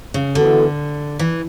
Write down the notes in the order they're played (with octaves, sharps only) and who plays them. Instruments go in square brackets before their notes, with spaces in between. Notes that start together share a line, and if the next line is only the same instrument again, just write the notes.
[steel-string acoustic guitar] C#3
[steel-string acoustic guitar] D3 [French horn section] E3 B3 F#4 A4
[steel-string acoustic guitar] E3